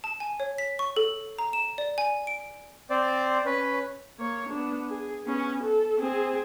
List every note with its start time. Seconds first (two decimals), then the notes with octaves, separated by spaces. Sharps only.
0.04 A5
0.20 G#5
0.40 C#5
0.58 B6
0.79 C#6
0.96 A4
1.39 A#5
1.53 E7
1.78 D5
1.98 G#5
2.27 D7
2.90 C4 C5 D5
3.45 C#4 B4
4.19 A#3 C#5
4.49 B3 D4
4.90 G#4
5.25 B3 C#4
5.64 A4
5.99 C4 G#4